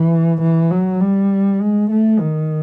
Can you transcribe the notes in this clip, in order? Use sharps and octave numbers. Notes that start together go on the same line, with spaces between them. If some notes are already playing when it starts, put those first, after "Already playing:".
Already playing: E3
E3
F#3
G3
G#3
A3
D#3